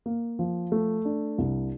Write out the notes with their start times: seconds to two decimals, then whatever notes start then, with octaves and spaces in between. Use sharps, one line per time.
0.06 A#3
0.39 F3
0.72 A3
1.05 D4
1.38 C2